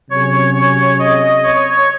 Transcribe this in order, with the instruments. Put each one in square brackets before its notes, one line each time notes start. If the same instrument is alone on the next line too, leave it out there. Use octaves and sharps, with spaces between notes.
[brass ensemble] C3 F#3 C#4 G#4 [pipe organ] C#5
[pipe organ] C#5
D#5
C#5